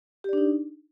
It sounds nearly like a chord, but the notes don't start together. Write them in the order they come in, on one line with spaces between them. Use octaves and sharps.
G4 D5 D4 D#4